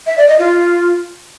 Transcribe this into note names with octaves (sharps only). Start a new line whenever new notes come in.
E5
D5
D#5
F4